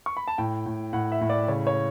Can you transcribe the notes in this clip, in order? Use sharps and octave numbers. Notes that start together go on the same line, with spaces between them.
C#6
B5
A5
A2 G5
A2
A2 F#5
E5
A2
D5
C#3 C#5
C#5